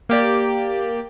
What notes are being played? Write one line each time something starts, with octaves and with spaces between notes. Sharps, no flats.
A#3 G4 D5